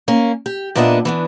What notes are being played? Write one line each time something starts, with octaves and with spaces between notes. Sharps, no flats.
A#3 C#4
G4
A#2 A#3 B3 D4 D#5 E5
E3 B3 D4